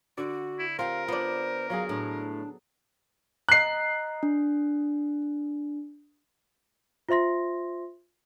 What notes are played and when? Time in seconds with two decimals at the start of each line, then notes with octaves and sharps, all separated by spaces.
0.17 D3 F#4 D5
0.59 E4
0.79 C4 F4 G4 A#4 F5
1.08 B3 D4 F4 C5 D5
1.70 F#3 G#4 F5
1.89 A2 D4
3.49 D#5 A#5 F#6 C7
4.23 D4
7.09 F4 C5 E5 C6 A#6